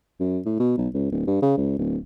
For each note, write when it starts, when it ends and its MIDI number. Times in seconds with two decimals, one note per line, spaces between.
0.20 0.39 42
0.46 0.56 45
0.60 0.76 47
0.78 0.88 35
0.94 1.11 37
1.12 1.23 26
1.27 1.39 43
1.42 1.54 49
1.57 1.78 37
1.78 1.97 26